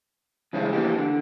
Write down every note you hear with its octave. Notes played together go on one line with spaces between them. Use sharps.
C#3 E3 G#3 C4 C#4
E3 A#3 G4
D3